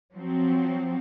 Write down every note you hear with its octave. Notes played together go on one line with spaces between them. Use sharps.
F3 F#3 C4